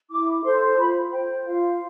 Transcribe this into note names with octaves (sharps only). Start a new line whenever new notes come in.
E4 D6
A4 C5 C6
F4 B5
C5 G5
F4 F5